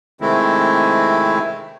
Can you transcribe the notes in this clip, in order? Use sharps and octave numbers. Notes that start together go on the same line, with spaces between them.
C3 D#3 G#3 A3 C4 E4